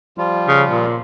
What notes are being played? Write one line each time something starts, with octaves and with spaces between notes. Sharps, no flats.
F3 G3 F4
C#3
A#2